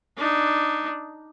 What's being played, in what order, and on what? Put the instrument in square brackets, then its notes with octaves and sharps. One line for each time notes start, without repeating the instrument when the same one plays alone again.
[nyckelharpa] D4 D#4